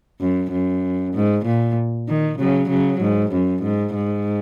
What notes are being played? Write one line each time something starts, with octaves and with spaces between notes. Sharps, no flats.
F#2
F#2
G#2
A#2
D#3
C#3 F#3
C#3 F#3
G#2
F#2
G#2
G#2